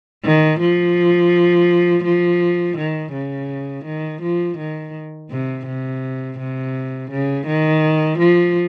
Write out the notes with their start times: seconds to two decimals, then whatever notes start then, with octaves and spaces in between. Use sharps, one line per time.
0.24 D#3
0.60 F3
2.04 F3
2.78 D#3
3.13 C#3
3.85 D#3
4.22 F3
4.58 D#3
5.31 C3
5.67 C3
6.39 C3
7.11 C#3
7.47 D#3
8.19 F3